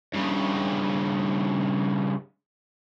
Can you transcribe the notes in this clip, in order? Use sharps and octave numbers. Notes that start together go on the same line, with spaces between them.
G2 C#3